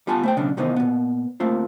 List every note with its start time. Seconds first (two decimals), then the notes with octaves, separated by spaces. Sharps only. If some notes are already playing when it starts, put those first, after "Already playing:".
0.07 G3 B3 F4 G#5 A5 B5
0.23 A3 C5 G5
0.37 B1 C#3 C#4 D4
0.57 C3 D#3 E3 B3 D#4 C5
0.76 A#2 B3
1.40 A3 A#3 C4 F4